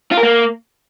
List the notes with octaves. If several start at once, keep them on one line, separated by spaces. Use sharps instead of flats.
F4
A#4
A#3